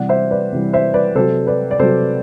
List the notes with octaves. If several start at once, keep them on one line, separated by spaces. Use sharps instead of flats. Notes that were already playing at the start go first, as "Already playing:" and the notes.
Already playing: C3 E3 G3 D5 F#5
C5 E5
B4 D5
C3 E3 G3
C5 E5
B4 D5
C3 F#3 A4 C5
B4 D5
D5
C3 F#3 A4 C5